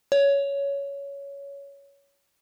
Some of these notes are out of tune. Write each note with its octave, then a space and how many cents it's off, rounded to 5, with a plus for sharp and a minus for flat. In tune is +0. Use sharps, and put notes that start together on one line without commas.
C#5 +15